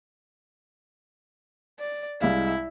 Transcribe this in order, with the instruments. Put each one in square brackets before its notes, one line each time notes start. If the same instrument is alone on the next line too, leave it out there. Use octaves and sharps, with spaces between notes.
[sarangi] D5
[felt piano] C2 G#3 F5 [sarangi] E4